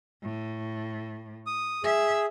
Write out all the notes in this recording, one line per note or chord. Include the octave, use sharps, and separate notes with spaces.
A2
D#6
G#4 E5